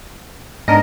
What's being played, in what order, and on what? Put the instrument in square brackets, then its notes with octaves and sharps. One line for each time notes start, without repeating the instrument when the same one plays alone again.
[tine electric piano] G#2 B3 D4 [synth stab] A#4 D#5